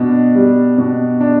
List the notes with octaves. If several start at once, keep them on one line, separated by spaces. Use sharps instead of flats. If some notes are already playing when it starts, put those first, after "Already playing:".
Already playing: B2 D4
G3
B2
D4